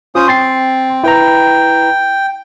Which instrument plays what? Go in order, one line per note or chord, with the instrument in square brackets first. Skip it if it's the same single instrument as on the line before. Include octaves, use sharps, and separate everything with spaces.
[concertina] C#4 C5 D#6 [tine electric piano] F4
[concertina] C4 [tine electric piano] C6 A6 C7
[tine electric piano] E4 B4 A#5 [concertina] G5